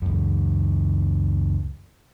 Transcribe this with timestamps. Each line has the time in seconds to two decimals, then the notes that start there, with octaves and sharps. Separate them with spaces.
0.02 C#2 F#2